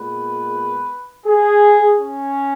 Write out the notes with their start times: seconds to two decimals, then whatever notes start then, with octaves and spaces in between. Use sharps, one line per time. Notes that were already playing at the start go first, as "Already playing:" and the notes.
Already playing: A#2 G#3 B3 B4
1.26 G#4
2.00 C#4